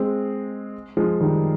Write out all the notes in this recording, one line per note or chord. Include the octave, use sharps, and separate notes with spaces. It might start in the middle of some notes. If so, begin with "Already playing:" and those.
Already playing: G#3 C4
F3 G#3
D#3 G3